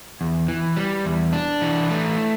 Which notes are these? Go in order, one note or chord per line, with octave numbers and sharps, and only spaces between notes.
E2
E3
G3
E2
D4
E3
A3